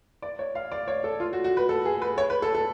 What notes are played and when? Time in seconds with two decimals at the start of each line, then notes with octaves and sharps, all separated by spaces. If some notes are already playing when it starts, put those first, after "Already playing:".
0.22 D5
0.39 C#5
0.55 F5
0.72 D5
0.88 C#5
1.04 A4
1.20 F4
1.33 F#4
1.44 F#4
1.57 B4
1.69 A4
1.85 G#4
2.02 B4
2.18 C#5
2.30 B4
2.42 A4
2.55 A4